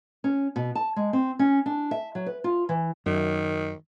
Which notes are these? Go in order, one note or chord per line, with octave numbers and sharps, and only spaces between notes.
C#4
B2
A5
G#3
C4
C#4
D4
E5
F#3
B4
F4
E3
F#2 D#3